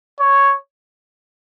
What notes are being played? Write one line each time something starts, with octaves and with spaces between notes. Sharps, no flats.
C#5